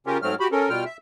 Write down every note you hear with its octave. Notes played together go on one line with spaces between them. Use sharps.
C#3 C#4 F4 G4 A#4
G#2 F#3 A3 C4 F6
F#4 G4 B5
C#4 A4 A#4
B2 G3 F4 G5 F6
E5